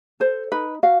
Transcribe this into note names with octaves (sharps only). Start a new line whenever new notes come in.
A4 C5
D#4 B4
F#4 F5